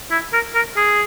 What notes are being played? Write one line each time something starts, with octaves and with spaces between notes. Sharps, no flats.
E4
A#4
A#4
G#4